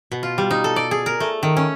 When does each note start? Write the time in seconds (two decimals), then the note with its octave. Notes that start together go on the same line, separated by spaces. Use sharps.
0.12 B2
0.23 F4
0.38 G3
0.51 D#4
0.64 A4
0.76 D5
0.91 G#4
1.06 A#4
1.20 A3
1.43 D#3
1.57 C#4